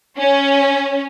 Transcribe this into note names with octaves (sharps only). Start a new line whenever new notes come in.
C#4